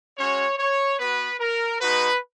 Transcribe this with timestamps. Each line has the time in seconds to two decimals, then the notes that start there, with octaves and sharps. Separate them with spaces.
0.17 G#3 C#4 F#4 C#5
0.59 C#5
0.99 B3 F#4 B4
1.40 A#4
1.80 G#3 D#4 F#4 B4